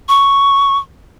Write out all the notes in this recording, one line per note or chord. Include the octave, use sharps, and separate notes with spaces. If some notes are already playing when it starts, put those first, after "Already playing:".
C#6